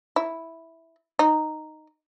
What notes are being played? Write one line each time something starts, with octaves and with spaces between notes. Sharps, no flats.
E4
D#4